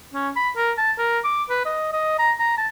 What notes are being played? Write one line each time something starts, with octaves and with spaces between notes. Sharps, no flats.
C#4
B5
A#4
A5
A#4
D6
B4
D#5
D#5
A#5
A#5
A5